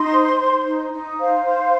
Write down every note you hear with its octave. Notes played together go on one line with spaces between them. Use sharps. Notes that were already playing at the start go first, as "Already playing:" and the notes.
Already playing: D#4 C6
C5
C5
D#4
D#4
C5 F5
C5